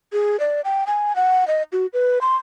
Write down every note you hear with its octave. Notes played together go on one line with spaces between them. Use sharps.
G#4
D5
G5
G#5
F#5
D#5
F#4
B4
C6